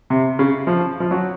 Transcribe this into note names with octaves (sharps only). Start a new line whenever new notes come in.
C3
C#3
F3
F3
F#3